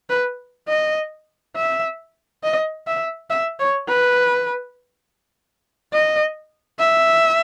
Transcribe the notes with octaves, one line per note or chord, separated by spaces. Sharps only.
B4
D#5
E5
D#5
E5
E5
C#5
B4
D#5
E5